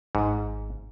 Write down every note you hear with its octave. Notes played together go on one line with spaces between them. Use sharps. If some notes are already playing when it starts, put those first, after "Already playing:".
G#1 G#2